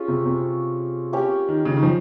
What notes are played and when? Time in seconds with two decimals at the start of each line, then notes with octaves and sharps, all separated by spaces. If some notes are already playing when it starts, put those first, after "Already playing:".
Already playing: C#4 F4 G#4
0.08 C3
0.26 C3
1.13 A#3 C#4 G4 C#5
1.49 D#3
1.65 C#3
1.77 D#3
1.83 F3